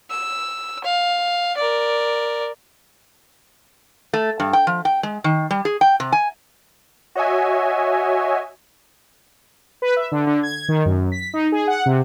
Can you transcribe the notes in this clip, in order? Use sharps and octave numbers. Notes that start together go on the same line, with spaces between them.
E6
F5
A#4 D5
A3
G2
G5
F3
G5
G#3
D#3
G3
G#4
G5
C3
G#5
F#4 C#5 D#5 E5 G#5
B4
E5
D3
D3
G#6
D#3
F#2
B6
D#4
G#4
F#5
C3